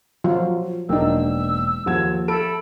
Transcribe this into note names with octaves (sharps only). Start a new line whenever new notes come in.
F3 F#3 F4
E1 F#3 A#3 D4 D#4 G5 E6
D#2 F3 F#5 G#6 E7
A4 B5 D7